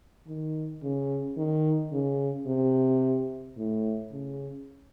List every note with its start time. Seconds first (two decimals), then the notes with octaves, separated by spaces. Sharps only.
0.28 D#3
0.83 C#3
1.37 D#3
1.92 C#3
2.47 C3
3.57 A2
4.12 C#3